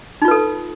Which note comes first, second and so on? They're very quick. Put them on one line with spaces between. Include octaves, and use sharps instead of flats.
D#4 F4 B4 A4